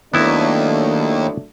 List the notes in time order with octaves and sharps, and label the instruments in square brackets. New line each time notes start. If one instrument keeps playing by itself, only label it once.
[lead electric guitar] D#2 [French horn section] F#3 A3 D4 [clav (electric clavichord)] B3 E4